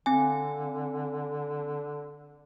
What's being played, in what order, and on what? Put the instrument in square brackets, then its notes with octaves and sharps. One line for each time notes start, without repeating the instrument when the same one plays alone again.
[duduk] D3 [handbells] C4 G#5